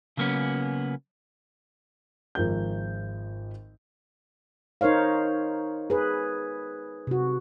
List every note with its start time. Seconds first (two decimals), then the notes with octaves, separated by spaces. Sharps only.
0.17 C#3 F#3 A#3 B3 C#4
2.35 G#1 F3 G#3 A#4 G6
4.81 D#4 A#4 C5 C#5 F5
5.90 G#4 B4
7.07 C3 F#4